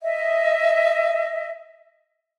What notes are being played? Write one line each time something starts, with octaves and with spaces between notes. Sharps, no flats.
D#5 E5